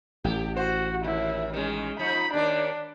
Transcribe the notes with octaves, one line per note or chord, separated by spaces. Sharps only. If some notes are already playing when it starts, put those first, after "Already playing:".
A1 A3 G4
F#4 C5
D#2 E4
D#3 G#3 C#4
F3 D#4 B5
D#2 D#3 D4 D5